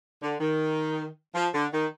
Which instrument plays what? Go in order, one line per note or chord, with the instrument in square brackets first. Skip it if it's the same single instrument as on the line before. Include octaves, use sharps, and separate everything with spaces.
[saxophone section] D3
D#3
F3
D3
D#3